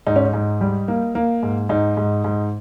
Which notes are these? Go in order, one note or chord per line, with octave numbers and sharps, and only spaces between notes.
G#2 D#4
C#4
D#4
G#2
G3
A#3
A#3
G#2
G#2 D#4
G#2
G#2